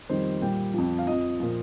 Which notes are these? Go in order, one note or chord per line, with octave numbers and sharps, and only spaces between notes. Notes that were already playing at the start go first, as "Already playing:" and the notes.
F2 D#3 G3 C5
A#2 G3 G5
F2 F3
F5
F2 F3 D#5
A#2 F3